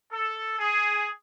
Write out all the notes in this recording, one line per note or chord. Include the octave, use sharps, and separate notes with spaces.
A4
G#4